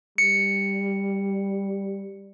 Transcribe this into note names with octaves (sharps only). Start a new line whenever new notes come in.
G3 C#7